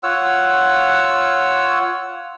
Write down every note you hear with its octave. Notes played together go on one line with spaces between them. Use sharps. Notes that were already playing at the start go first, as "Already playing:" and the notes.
F4 C#5 F#5 E6